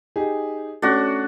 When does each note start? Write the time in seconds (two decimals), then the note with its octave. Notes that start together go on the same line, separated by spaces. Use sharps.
0.16 D#4 G4 G#4
0.82 A3 C#4 D4 F#4